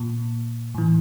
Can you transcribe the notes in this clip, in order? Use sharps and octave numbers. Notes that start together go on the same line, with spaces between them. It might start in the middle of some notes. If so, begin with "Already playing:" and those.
Already playing: A#2
A2 E3